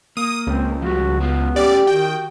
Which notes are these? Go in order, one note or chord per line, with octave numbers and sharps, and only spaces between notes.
A#3 D#6
C#2 C4
F3 G3 F#4
F#3 B3 F4
A3 C#4 G4 D5 G#5
D#3 F#4 G5